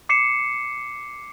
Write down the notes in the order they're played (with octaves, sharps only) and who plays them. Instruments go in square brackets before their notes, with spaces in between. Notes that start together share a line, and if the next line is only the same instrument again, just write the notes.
[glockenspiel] D6 C7 C#7 E7